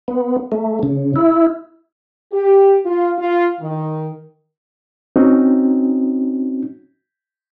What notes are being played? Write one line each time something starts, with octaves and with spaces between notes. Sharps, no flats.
B3
A3
C#3
E4
G4
F4
F4
D#3
C4 C#4 D#4 F#4